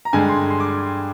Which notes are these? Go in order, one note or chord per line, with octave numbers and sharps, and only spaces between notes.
A#5
G2 D3 G#3 G#5
C6
C6
D6